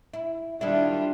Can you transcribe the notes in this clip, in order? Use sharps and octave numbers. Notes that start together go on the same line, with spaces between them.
E4
D#3 G3 D4 E4 F4